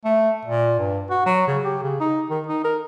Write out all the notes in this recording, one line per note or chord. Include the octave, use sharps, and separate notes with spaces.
A3
A#2
G2
F#4
F#3
C#3
G4
C#3
D#4
D#3
D#4
A#4